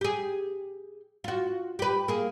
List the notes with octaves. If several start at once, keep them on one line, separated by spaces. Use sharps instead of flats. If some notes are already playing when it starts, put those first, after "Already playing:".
G4 G#4
F4 F#4
G4 B4
A#3 G#4